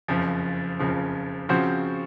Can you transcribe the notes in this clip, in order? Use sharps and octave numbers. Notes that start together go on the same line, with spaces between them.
F#1 F2 C#3 F3
F#1 F2 C#3 F3
C#3 F3 C4 F#4 C5